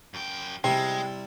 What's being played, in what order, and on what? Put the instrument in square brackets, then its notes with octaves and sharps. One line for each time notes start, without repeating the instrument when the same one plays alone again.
[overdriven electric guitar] F#2 G5
[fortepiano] C3 [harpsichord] G3 E4 [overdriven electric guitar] G#3 [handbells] G5